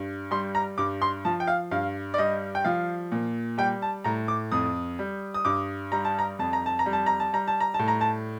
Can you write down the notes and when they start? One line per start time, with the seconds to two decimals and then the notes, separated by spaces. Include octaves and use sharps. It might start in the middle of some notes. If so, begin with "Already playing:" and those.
Already playing: G2
0.31 G3 C6
0.55 A#5
0.78 G2 D6
1.02 C6
1.25 F3 A5
1.40 G5
1.47 F5
1.71 G2 F5
2.14 D5
2.18 G3 D#5
2.55 G5
2.65 F3 F5
3.12 A#2
3.58 G3 G5
3.82 A5
4.04 A2 A#5
4.28 D6
4.52 F2 D#6
4.99 G3
5.34 D#6
5.45 G2 D6
5.92 G3 A#5
6.05 A5
6.19 A#5
6.39 F2 A5
6.53 A#5
6.66 A5
6.79 A#5
6.86 G3
6.93 A5
7.06 A#5
7.20 A5
7.33 G3 A#5
7.48 A5
7.60 A#5
7.74 A5
7.79 A2
7.88 A#5
8.01 A5